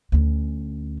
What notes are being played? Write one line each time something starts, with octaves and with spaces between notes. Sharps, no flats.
D2 C#4